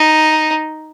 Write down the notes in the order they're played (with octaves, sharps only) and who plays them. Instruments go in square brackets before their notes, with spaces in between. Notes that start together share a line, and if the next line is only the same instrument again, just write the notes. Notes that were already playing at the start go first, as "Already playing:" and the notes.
Already playing: [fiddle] D#4